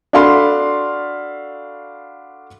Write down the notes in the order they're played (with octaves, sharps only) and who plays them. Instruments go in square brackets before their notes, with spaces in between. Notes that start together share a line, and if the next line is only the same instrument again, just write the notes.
[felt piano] D4 F#4 A4 F5 B5 C6